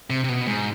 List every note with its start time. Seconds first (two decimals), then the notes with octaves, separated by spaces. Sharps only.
0.10 C3
0.24 C3
0.29 B2
0.47 G#2